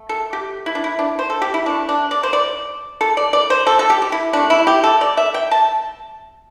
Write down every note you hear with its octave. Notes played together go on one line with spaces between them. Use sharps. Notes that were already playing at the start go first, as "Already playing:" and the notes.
Already playing: A3
A4
G4
E4
D4
E4
D4
C5
A4
G4
E4
C3 A3 D4
D4
D5
C5
D5
A4
D5
D5
C5
A4
A4
G4
G4
E4
C3 A3 D4
E4
G4
A4
D5
E5
G5
A5